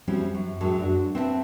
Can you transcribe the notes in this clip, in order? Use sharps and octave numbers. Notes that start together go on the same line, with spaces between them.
F3 G3 C4 C#4 E4 F#4
F#2
F#2 A2 F#3 G#3 A4
D4 F#4
C4 B4 E5 F5 A5